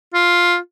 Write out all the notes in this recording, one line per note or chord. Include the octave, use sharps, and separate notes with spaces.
F4